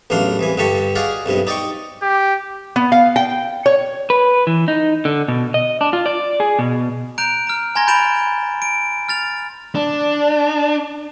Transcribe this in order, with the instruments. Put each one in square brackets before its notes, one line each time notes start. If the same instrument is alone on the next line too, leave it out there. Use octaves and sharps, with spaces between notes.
[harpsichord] A1 E2 F#3 D4 F5 C6
C2 E3 G#5
G2 D3 G3 G4 A4 C#6
F#4 G#4 D5 D#5 F5
B1 G2 C3 D#5
D#4 D5 D#5 G5 C#6
[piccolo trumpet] G4
[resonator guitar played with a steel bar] B3
F5
G5
C#5
[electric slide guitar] B4
E3
D#4
D3
B2
D#5
D4
F4
D5
G#4
B2
[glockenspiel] A#5 F#6 G6 D7 F7
A#5 F6
G#5 A#5 C6 G#6 A#6 G7
B5 G6 A6 D7 E7 F7
D7
F6 A6 F7
[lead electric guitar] D4